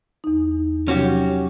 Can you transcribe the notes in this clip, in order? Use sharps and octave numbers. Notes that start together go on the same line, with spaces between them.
E2 D#4
C3 F3 F#3 C#4 F#4 G4